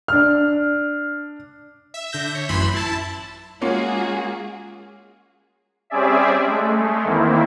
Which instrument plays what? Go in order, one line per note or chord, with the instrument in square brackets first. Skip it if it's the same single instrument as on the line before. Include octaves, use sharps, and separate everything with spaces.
[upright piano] D4 F6
[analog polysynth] E5
D3 E5 G6 A#6
C#5
A1 F#2 E3 B5 C6
E4 A5
[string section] G#3 F#4 G#4 [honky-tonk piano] A#3 C#4 F4
[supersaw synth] G3 C4 C#4 G#4 D5 E5
G#3 A3
E2 D#3 A#3 C4 E4